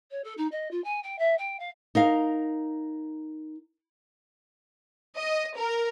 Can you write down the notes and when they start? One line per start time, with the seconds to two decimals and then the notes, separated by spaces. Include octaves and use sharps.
0.10 C#5
0.24 A4
0.37 D#4
0.51 D#5
0.71 F4
0.84 G#5
1.03 G5
1.18 E5
1.38 G5
1.59 F5
1.95 D#4 A#4 F5
5.17 D#5
5.57 A#4